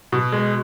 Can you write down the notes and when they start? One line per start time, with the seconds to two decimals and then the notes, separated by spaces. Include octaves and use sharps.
0.12 B2
0.32 G#3